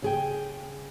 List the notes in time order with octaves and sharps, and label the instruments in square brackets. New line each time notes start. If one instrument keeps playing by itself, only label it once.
[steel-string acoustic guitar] C#3 G#4 G5